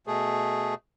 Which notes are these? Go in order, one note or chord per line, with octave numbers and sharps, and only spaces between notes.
B2 A3 G#4